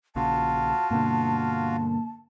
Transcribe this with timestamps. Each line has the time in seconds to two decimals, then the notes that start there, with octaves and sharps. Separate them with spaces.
0.16 A#1 A#2 C#3 F4 F#4 F5 A5
0.91 G2 B2 D3 A#3